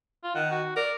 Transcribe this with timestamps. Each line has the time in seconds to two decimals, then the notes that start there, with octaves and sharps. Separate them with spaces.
0.24 F4
0.35 D#3 F#5
0.51 F#4
0.76 A#4 D5